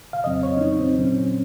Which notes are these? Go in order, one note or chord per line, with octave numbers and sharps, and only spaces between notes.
F5
F2 C#3 F#3 C4 D#5
C#5
C#4
D#4
C4
A#2 F#3 C4 C#4